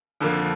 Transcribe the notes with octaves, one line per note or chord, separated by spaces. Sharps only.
F2 D3 F3 A#3